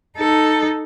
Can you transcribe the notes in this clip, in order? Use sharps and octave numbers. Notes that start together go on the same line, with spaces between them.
D#4 A4